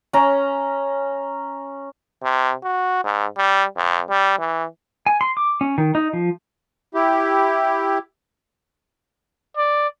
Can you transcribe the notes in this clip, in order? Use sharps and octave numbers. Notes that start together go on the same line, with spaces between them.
C#4 A#5
C3
F#4
G#2
G3
F2
G3
E3
G#5
C6
D6
C#4
D#3
D#4
F3
E4 G4
D5